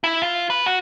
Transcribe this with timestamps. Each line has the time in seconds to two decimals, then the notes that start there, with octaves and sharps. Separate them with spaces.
0.04 E4
0.22 F4
0.50 B4
0.66 F#4